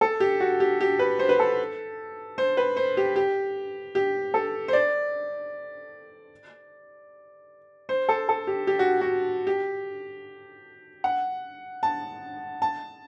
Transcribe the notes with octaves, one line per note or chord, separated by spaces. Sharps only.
A4
G4
F#4
G4
G4
B4
C5
B4
A4
C5
B4
C5
G4
G4
G4
A4
C5
D5
C5
A4
A4
G4
G4
F#4
F#4
G4
F#5
A5
A5